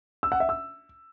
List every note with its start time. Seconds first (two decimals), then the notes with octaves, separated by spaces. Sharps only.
0.23 E6
0.32 F#5
0.40 E5
0.49 E6